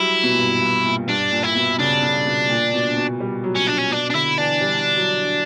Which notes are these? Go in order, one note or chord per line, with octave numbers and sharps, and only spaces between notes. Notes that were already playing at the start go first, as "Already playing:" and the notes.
Already playing: F#3 G3 E4
B2
A#2
G2
G2
A#2
G2 D4
A#2
E4
B2
C#3 D4
C#3
B2
A#2
B2
B2
G3
F#3
C#4
D4
C#4
B2 D4
D4
D3 E4
E3 D4
G3
F#3